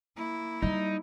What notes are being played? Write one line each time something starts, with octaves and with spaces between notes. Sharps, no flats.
A#3 E4
G3 D#4